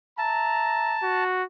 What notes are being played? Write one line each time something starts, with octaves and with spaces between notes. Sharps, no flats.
E5 A5 A#5
F#4